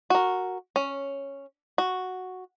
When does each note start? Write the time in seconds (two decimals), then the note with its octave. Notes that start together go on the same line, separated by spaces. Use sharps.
0.10 F#4 A#4
0.76 C#4
1.78 F#4